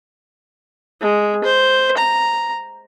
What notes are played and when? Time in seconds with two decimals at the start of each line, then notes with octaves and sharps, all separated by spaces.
1.01 G#3
1.44 C5
1.97 A#5